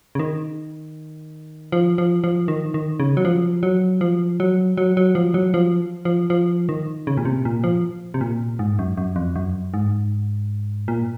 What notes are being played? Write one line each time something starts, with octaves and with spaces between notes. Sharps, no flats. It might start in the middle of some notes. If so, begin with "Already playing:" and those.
C#3
D#3
F3
F3
F3
D#3
D#3
C#3
F#3
F3
F#3
F3
F#3
F#3
F#3
F3
F#3
F3
F3
F3
D#3
C#3
A#2
C3
A#2
F3
C3
A#2
G#2
F#2
F#2
F2
F#2
G#2
A#2